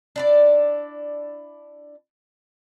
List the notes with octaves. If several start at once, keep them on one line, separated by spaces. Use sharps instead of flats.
D4 E4 D5